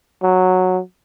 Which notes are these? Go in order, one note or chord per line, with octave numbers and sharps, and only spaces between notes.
F#3